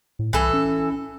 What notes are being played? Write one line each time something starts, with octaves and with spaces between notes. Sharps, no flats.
A2
C2 E3 A4
C#4